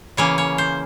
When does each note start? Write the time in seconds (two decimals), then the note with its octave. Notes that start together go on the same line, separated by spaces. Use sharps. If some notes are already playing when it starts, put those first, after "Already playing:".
0.17 C#3 E3 A#3 C#4 C#5
0.38 C#5
0.58 C5